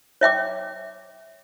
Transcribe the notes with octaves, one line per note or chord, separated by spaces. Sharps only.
C#5 E5 G5 D6